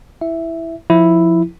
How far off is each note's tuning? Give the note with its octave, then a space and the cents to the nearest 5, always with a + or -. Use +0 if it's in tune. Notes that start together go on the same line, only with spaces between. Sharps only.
E4 +0 E5 +0
F3 +0 E4 +0